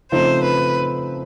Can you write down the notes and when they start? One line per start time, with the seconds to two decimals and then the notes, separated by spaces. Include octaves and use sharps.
0.12 C#3 F3 A3 C4 D#4 C5
0.43 B4